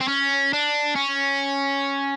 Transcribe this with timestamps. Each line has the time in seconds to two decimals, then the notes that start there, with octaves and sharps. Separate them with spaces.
0.01 C4
0.08 C#4
0.53 D4
0.96 C#4